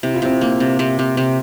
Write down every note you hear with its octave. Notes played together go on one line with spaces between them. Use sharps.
C3 E4
F4
C3 C4 E4
A#3
C3
C3
C3
C3